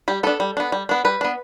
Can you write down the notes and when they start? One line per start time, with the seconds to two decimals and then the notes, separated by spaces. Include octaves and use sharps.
0.08 G3 G4
0.23 B3 D4 A4
0.40 G3
0.57 B3 D4
0.72 G3
0.89 B3 D4
1.05 G3 B4
1.21 B3 D4